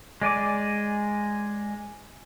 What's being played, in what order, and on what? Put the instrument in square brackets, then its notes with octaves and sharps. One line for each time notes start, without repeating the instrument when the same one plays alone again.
[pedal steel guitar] G#3 D5 G#5 D6